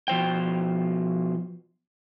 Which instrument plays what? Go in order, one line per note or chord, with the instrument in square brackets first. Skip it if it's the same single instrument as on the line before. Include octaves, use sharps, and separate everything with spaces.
[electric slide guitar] B2 F3 C5 G5